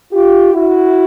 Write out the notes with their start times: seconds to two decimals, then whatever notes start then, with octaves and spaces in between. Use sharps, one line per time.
0.12 F4 G4
0.53 E4 F#4